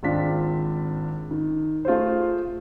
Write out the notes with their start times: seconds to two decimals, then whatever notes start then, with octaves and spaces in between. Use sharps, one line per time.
0.03 G#1 G#3 C4 D4 F4 B6
1.31 D#3
1.85 A3 F4 G#4 C5